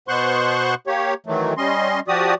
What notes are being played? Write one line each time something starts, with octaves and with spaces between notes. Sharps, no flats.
B2 B3 C5 C6 C#6 F#6
A#3 G4 C#5
D#3 E3 F#3 A3
G3 C#4 D#5 C6
F3 F#4 G4 D5 D#6